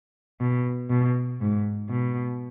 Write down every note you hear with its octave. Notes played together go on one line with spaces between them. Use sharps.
B2
B2
G#2
B2